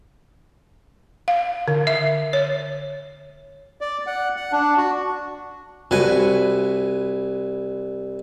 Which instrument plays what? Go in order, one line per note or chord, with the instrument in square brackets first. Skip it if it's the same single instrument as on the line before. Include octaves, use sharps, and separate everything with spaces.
[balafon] F5
D3
E5
C#5
[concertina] D5
F#5
F#5
D4
F#4
[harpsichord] C2 B4 G#5 [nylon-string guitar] F#4